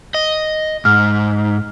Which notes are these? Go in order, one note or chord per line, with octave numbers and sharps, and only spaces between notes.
D#5
G#2 F6